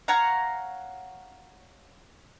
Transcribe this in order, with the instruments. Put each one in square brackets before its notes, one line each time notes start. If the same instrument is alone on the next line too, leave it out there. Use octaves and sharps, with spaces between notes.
[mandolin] C#5 F5 F#5 A#5